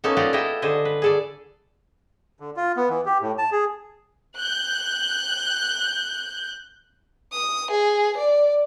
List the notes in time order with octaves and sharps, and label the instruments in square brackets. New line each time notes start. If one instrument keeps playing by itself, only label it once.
[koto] A#3 B3 C#4 D#4 A4
D#4 F4 G4 D5 D#5 F#5
E4 F4 A4 D#5 E5 G5
D3 C5 D#5 G#5
B4
G#4 A4 D5
[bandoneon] D3
F4
B3
E3
G4
A2
A5
G#4
[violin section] F#6 G6
[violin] D#6
G#4
D5